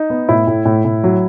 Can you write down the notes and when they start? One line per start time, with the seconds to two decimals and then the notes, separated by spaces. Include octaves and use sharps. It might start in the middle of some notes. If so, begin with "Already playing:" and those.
Already playing: D#4
0.10 B3
0.29 A2 E4
0.47 A2
0.65 A2
0.85 A2
1.04 F#3